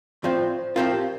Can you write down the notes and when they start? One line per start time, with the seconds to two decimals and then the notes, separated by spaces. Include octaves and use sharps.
0.24 A2 F3 C4 F4 D5
0.41 D5
0.59 C5
0.75 A2 F3 C4 F4 A#4
0.93 G4